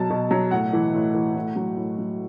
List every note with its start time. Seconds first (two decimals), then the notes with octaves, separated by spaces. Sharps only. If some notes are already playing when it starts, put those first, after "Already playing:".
Already playing: B2 F#3 A5
0.10 B2
0.31 F#3
0.51 A2 F#5
0.73 E3
0.94 A2
1.14 E3
1.36 A2
1.56 F#3
1.77 A2
1.98 F#3